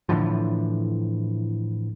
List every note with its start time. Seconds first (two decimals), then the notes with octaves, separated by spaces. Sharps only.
0.09 A2 D3 E3 F3